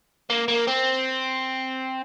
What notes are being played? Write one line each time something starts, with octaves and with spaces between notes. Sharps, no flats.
A#3
A#3
C4